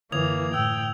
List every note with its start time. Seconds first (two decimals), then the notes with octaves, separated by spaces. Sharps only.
0.12 F#2 D3 E3 A#3 D#6 G#6 F7
0.54 A2 G5 E6